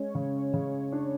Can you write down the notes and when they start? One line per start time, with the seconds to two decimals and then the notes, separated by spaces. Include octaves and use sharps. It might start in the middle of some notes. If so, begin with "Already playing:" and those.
Already playing: G#3 C#4 C#5
0.15 C#3
0.53 C#3
0.92 D4